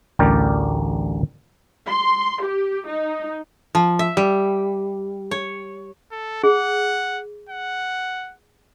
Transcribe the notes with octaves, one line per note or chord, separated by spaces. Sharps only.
A1 D2 G3 G4 A#4 D5
C6
G4
D#4
F3
E5
G3
C#5
A4
G#4 F#5
F#5